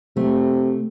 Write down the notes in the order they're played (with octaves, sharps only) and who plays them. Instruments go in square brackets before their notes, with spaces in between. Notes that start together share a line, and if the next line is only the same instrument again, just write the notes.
[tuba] C3 [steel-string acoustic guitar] A3